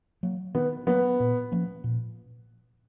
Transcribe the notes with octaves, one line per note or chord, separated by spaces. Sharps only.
F#3 A#3
D#3 B3
F#3 A#3 B3
A#2
F3 A#3 C#4
A#2